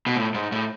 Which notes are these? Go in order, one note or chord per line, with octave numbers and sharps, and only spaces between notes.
B2
A2
G#2
A2